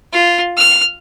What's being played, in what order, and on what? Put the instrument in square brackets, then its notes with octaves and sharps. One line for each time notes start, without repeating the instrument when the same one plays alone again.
[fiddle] F4
F6